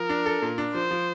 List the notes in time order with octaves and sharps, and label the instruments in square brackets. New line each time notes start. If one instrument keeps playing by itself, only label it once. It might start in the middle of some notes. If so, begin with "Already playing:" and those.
Already playing: [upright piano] F3 [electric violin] A#4
[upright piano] D4
A4
A#2
D4
[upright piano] F3 [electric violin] C5
[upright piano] F3